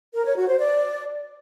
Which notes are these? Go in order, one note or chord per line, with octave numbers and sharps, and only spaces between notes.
A#4
C#5
F#4
C5
D5